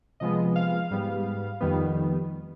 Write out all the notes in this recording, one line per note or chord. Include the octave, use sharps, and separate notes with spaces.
C3 F3 G#3 B3 D#5
F5
G#2 G3 B3
F2 D#3 G3 B3